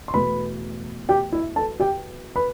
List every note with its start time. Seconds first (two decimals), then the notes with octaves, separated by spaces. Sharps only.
0.08 C6
0.14 E2 B2 A3 B4 B5
1.09 G4 G5
1.33 E4 E5
1.56 A4 A5
1.80 G4 G5
2.36 B4 B5